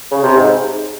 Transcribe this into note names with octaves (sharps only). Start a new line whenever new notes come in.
C#3
C3
G#2